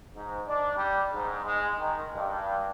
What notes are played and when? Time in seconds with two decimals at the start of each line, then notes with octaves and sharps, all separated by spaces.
0.15 G#2
0.47 D4
0.75 G3
1.12 G#2
1.45 G#3
1.78 D#3
2.15 G2